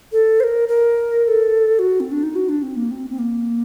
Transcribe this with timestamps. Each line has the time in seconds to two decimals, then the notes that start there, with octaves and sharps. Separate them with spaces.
0.12 A4
0.40 C5
0.44 A#4
0.68 A#4
1.24 A#4
1.28 A4
1.79 F#4
2.00 C4
2.12 D4
2.23 D#4
2.36 F#4
2.49 D4
2.63 C4
2.76 A#3
2.91 C4
3.10 C4
3.19 A#3